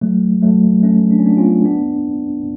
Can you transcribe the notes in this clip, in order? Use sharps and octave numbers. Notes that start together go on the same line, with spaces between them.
F#3 A3
F#3 A3
A3 C#4
D4
C#4
B3 D4
C#4 F4
B3 D4